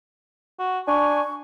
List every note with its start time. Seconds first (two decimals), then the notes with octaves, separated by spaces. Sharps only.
0.59 F#4
0.88 D4 G#5 C#6